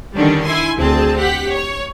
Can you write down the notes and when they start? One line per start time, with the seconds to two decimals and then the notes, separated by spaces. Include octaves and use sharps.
0.15 D3 D#3 G3 C#4 D4
0.45 E4 G#5 C6
0.77 D2 C4 G#4 A5
1.19 G4 F#5 B6
1.51 C#5